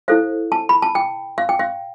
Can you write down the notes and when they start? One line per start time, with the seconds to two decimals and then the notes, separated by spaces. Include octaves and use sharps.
0.08 E4 A4 C5 F5
0.52 A5
0.69 B5
0.82 A5
0.95 G5
1.38 F5
1.49 G5
1.59 F5